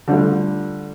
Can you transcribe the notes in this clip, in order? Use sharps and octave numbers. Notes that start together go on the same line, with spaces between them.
D3 G3 A3 F4